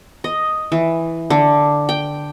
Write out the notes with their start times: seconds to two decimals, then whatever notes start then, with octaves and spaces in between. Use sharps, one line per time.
0.24 D#5
0.72 E3
1.30 D3
1.89 G5